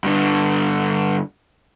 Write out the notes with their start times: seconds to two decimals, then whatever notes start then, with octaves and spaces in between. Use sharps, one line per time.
0.04 G2 D3